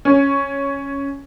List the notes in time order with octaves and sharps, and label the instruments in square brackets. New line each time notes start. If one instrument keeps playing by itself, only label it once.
[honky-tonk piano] C#4